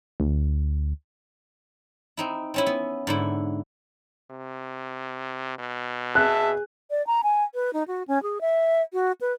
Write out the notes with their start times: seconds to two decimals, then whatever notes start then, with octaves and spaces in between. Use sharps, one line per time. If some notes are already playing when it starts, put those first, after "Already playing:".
0.20 D2
2.17 C4 D#4 E4
2.54 C4 C#4 E4
2.66 B3
3.07 G#2 D3 E4
4.30 C3
5.58 B2
6.15 G#4 E5 A5 F#6
6.91 D5
7.07 A#5
7.24 G#5
7.54 B4
7.73 D#4
7.88 F#4
8.08 C#4
8.23 G#4
8.41 E5
8.93 F#4
9.21 B4